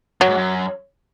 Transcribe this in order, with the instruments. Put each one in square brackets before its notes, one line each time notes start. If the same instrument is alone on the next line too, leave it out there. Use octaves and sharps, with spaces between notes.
[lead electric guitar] F#2 [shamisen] F#3
[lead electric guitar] G#2
F#2